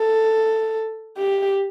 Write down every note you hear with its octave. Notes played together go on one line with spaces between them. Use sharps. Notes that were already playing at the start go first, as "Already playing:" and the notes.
Already playing: A4
G4